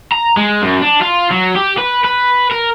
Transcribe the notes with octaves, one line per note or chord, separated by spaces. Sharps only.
A#5
G#3
F#2
D4
F4
F#3
G4
B4
B4
A#4